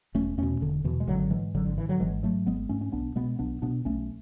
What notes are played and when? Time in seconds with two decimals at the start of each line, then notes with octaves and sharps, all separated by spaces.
0.14 E1 A3 C#4
0.38 E2 B2 A3 C#4
0.61 E1 D3
0.84 E2 B2 E3
1.00 G#3
1.07 G#1 D3 F#3
1.30 G#2 E3 G#3
1.54 G#1 D3 F#3
1.66 D3
1.77 G#2 E3
1.89 D3 F#3
2.00 G#1 E3 G#3
2.23 G#2 F#3 A3
2.46 G#1 G#3 B3
2.69 G#2 A3 C#4
2.81 C#4
2.92 B1 B3 D4
3.16 B2 G#3 B3
3.39 B1 B3 D4
3.62 B2 B3 D4
3.85 B1 A3 C#4